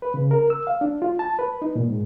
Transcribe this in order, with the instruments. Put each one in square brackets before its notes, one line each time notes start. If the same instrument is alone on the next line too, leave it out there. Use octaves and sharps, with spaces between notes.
[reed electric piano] B4
C#3
A#4
E6
F5
D4
F4
A5
B4
D#4
A#2
G#2